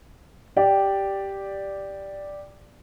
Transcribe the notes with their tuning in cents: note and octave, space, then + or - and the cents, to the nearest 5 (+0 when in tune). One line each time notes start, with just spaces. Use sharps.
G4 +0 D5 +0